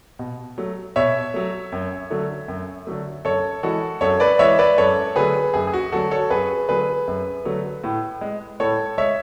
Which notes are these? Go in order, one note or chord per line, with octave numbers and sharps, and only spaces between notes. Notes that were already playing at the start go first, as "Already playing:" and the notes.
B2
F#3 A3
B2 C#5 E5
F#3 A3
F#2
D3 F#3 A3
F#2
D3 F#3 A3
F#2 A4 C#5
E3 G#3 F#4 A4
F#2 A4 C#5
B4 D5
E3 G#3 C#5 E5
B4 D5
F#2 A4 C#5
D3 F#3 A3 G#4 B4
F#2 G#4
G#4
F#4
D3 F#3 A3 F#4 A4
A4 C#5
F#2 G#4 B4
D3 F#3 A3 G#4 B4
F#2
D3 F#3 A3
A2
G#3
A2 A4 C#5
G#3 C#5 E5